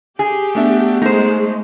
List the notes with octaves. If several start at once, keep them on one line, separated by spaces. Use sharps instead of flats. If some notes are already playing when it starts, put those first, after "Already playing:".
G4 G#4
A3 B3 D4 E5
G#3 A3 D#4 C5